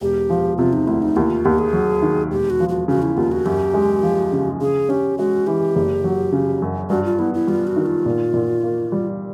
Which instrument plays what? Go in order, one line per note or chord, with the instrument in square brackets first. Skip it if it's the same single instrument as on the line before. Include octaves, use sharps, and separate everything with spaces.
[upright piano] E1 [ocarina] G4
[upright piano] F3
[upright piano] C3 [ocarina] F4
[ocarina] D#4
[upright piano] D2 [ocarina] E4
[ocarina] D#4
[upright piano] D#2 [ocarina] E4
[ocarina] F4
[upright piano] D#2 [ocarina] G4
[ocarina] G#4
[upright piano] F#3
D#3
[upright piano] E1 [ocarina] G4
[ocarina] F#4
[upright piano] F3
[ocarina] F#4
[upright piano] C#3 [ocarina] F#4
[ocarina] E4
[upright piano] D#2 [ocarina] F4
[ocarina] F#4
[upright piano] F#2 [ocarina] G4
[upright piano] G#3
F3
C#3
[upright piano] C#3 [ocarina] G#4
[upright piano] C#4 [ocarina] G4
[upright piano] G#3 [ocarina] F#4
[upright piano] E3 [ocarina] G4
[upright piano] F#1
F#3
C#3
F#2
[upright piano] G2 [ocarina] F#4
[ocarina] F4
[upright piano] B3 [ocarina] E4
[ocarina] E4
[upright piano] G3 [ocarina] F4
[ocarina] F#4
[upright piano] D#3
[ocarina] F4
[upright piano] A#2
A#2
A#3
G3